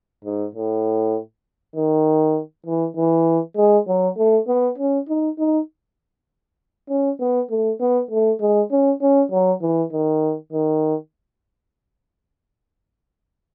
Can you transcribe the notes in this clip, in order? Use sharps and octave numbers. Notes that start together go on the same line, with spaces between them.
G#2
A2
D#3
E3
E3
G#3
F#3
A3
B3
C#4
D#4
D#4
C#4
B3
A3
B3
A3
G#3
C#4
C#4
F#3
E3
D#3
D#3